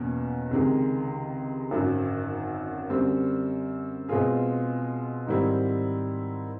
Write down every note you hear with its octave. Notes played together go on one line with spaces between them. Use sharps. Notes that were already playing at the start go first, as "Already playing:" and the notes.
Already playing: E2 B2 A#3 C#4
C#2 C3 D#3 G#3
G#1 F#2 D3 F#3
F#2 D3 G3 C4
B2 G#3 C4 F4 G#4
G#2 D#3 G3 C4 E4